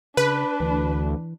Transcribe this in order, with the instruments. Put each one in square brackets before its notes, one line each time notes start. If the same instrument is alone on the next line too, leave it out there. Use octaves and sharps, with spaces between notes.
[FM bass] C#3 [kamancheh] D4 [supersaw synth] B4
[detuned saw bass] D2 [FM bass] E3